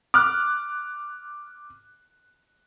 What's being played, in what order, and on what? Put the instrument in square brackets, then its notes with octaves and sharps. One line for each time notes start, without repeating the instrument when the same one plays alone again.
[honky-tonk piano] D6 F6 F#6